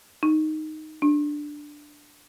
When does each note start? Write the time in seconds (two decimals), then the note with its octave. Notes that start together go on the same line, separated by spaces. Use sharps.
0.23 D#4
1.02 D4